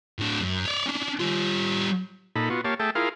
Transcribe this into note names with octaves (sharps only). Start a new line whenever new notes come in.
A2 D4
F#2
C#5 D5
C#4 D4
G3 F4
A#2 D#4 A4 B5
B3 F4 F#4
A#3 G4 C#5 F5 A5
A3 G#4 E5 G5 A5
E4 F4 G#4 A#4 F5